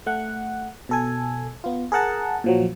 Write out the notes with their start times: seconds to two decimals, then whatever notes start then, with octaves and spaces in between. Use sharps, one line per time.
0.06 A3 F#5
0.89 B2 A4 G#5
1.64 B3 F4
1.92 G#4 A#4 F#5 A5
2.44 A#2 F3 F#3